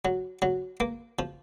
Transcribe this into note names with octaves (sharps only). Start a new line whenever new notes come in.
F#3
F#3
A#3
F3